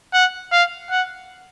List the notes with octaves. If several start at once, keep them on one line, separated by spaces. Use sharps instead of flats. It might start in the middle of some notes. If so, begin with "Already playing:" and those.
F#5
F5
F#5